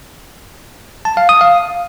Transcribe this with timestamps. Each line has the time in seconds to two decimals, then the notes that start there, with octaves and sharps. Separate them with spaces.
1.05 A5
1.17 F5
1.29 D#6
1.41 F5